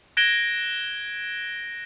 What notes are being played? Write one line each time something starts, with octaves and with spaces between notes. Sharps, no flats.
F#6 G#6 A#6 D7 E7 G7